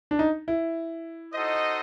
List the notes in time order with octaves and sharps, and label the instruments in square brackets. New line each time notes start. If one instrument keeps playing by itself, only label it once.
[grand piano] D4
D#4
E4
[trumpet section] D#4 F#4 A4 C5 D#5